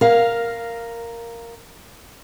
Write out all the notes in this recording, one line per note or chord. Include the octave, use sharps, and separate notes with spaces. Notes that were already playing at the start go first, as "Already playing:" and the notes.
A#4 F5